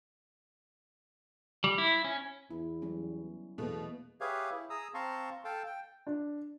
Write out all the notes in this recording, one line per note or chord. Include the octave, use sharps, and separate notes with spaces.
G3
E4
C#4
E2 E4
F#3 G3 C#4
E2 B2 A3 A#3 B4
G4 G#4 B4 C#5 E5 F5
E4
G#4 A#5 D#6 E6
C4 F5 A5 A#5 C6 C#6
A4 F5 G5 A5
G5
D4